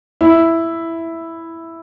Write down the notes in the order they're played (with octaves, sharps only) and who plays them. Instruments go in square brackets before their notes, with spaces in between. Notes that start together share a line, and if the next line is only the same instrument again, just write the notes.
[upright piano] E4